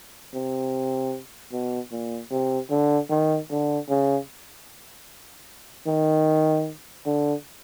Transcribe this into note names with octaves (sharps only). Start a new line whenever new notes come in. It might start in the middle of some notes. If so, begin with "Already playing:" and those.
C3
B2
A#2
C3
D3
D#3
D3
C#3
D#3
D3